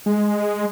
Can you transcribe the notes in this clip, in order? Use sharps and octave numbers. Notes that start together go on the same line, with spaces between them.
G#3